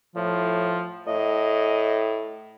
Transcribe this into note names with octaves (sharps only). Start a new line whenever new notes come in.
A2 F3
A2 D#5